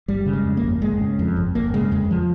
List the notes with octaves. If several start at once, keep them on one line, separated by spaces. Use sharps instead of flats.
G1 G3
C#3
G#3
F2
A#3
G1
G1 G#3
C#3
F2
G1
G1 A#3
C#3 G#3
F2 G#3
F3